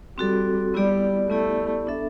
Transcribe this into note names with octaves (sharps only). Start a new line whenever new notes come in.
G3 C4 F#4 A4
G3 B3 E4 G4 D5
A3 B3 E4 G4 D5
B3 D4 A4 E5